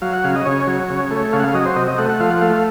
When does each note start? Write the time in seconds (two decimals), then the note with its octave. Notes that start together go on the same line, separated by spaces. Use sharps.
0.02 F#3 F5
0.14 F#5
0.24 C#3 F5
0.36 D#5
0.45 C#3 C#5
0.67 F#3
0.90 C#3
1.11 A3
1.33 C#3 F5
1.40 F#5
1.44 F5
1.54 F#3 D#5
1.65 C5
1.76 C3 D#5
1.88 D#5
1.98 A3 F#5
2.09 F#5
2.20 F3 F5
2.31 F#5
2.41 A3 F5
2.53 F5